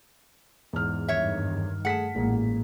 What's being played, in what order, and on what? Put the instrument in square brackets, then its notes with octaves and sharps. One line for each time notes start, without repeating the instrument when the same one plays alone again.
[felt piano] E2 G#2 F6
[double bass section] G2 D#3 [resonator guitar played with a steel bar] C#5 E5
[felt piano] A3 G#4 B6 [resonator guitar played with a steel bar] F#5 A5
[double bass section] A1 [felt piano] A#2 G#3 A#3